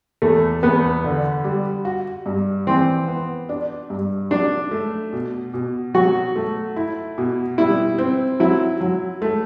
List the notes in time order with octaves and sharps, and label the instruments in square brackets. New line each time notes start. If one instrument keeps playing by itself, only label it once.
[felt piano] E2 [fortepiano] A3
[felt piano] E2 [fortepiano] B3
[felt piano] D3
G3
F#4
G2
[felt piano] E3 [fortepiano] C4
[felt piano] B3
D4
G2
[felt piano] F#3 [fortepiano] D4
[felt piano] A3
B2
B2
[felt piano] F#3 [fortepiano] F#4
[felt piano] A3
E4
B2
[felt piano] G3 [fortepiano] E4
[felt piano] C4
[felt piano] F#3 [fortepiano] E4
[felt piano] F#3
A3